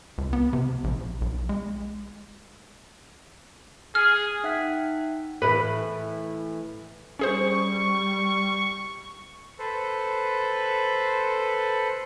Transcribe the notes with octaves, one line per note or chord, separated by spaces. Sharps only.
C#2
B3
C3
A#1
B1
G#3
G#4 F6
D#4 E5 F#5 G5 F#6 B6
A2 E3 E4 B4
G3 C#4 G#4 C5 C#6
A4 B4 C5